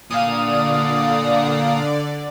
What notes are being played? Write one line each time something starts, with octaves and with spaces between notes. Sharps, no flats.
A#2 D3 D5 F5 D#6